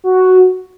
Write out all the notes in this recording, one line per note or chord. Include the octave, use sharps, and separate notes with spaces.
F#4